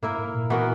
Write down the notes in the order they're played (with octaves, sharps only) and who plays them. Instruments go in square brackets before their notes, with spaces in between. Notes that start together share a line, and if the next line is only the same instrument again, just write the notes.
[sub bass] G#2 [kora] A#3 E4 A#4
[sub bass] G#2
A#2
[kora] E3 B3 F#4 A#4